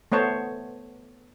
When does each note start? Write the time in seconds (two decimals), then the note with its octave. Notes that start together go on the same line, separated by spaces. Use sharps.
0.12 A3 B3 C5 C#5 A5